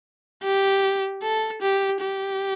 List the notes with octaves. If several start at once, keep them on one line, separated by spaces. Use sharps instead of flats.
G4
A4
G4
G4